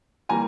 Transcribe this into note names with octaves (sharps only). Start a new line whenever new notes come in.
E3 G3 A#3 G#5 A#5